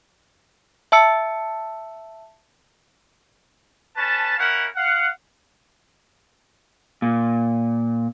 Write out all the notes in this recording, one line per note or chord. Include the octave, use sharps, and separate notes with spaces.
E5 A5 E6 C#7
C#4 B4 A5
C#4 E4 A#4 F5 F#5
F5 F#5
A#2